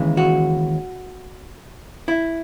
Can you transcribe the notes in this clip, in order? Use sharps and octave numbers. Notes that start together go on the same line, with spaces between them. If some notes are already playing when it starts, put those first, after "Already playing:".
Already playing: D#2 C#3 E3 G#3
F#4
E4